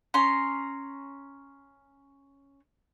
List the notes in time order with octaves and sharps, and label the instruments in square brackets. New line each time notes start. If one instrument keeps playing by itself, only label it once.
[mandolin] C#4 A#5 C6